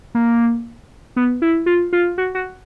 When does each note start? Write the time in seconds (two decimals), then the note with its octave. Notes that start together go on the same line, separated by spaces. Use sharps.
0.15 A#3
1.16 B3
1.42 E4
1.66 F4
1.93 F4
2.18 F#4
2.35 F#4